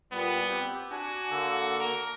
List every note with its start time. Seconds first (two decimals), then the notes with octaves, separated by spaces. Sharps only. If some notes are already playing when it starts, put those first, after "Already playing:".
0.12 A#2 G3 B3
0.49 C4 G4
0.91 D4 F#4 G#5
1.31 D3 A#3 A4
1.80 A#4